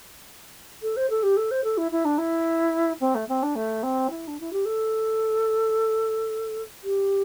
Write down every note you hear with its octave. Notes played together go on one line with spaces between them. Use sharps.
A4
C5
A4
G4
A4
C5
A4
E4
E4
D4
E4
C4
A3
C4
D4
A3
C4
E4
D4
E4
G4
A4
G4